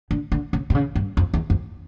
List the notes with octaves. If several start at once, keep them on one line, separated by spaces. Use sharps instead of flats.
D3
D3
C#3
C3
C#3
G2
F2
E2
F2